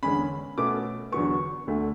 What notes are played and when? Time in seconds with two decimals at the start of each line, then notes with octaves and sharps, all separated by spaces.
0.03 E2 D3 G#3 C#4 B5
0.58 B2 A3 C#4 D6
1.12 E2 D3 F#3 B3 C#6
1.67 D2 D3 A3